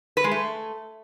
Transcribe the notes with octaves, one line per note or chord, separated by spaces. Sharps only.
B4
G#3
A3